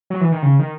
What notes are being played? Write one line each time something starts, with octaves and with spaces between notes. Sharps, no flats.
F#3
E3
D#3
C#3
D#3